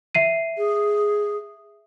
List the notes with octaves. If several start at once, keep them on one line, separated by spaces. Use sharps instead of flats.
E5 C7 D#7
G#4